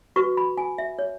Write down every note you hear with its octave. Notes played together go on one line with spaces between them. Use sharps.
F#4 B4 C#6
B5
G#5
E5
C#5